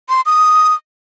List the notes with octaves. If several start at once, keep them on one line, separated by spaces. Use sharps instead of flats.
C6
D#6